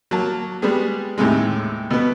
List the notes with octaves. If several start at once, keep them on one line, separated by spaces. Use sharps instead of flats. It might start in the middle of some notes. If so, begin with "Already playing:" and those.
F#3 A#3 A5
G3 G#3 B3 G#4
D#2 A2 C3 G#3
B2 B3